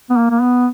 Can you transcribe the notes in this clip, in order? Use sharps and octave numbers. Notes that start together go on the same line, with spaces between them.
B3
A#3
A#3
B3